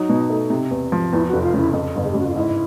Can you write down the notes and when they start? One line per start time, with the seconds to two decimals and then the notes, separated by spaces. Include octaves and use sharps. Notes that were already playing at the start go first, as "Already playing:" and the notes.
Already playing: F#3 D#4
0.09 B2
0.30 A3
0.50 C3
0.71 E2
0.92 F3
1.12 E2 E4
1.28 F#4
1.33 F1
1.42 F4
1.54 C#3 E4
1.73 F2
1.95 G1
2.04 G#4
2.11 G4
2.15 C#3 F#4
2.27 F4
2.35 G#2 E4